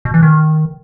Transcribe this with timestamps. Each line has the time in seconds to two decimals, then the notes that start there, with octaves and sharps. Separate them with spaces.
0.05 B2
0.14 E3
0.23 D#3